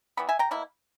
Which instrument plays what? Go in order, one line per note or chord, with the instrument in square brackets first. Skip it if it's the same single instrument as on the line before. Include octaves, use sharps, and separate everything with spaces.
[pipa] E3 G3 B3 B5
E5 G#5
G5 A#5
B2 A#3 E4